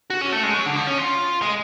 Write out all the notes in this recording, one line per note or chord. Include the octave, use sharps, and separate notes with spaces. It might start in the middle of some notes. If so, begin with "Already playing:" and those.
F#4
C#4
A3
G#3
F#3
D3
F3
C#4
F4
G#3